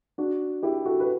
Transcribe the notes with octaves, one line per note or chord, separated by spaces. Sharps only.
D4 F#4
E4 G4
F#4 A4
B4